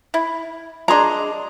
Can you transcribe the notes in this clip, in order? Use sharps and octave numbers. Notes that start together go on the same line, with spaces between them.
E4
G#3 D4 G#4 A#5 C6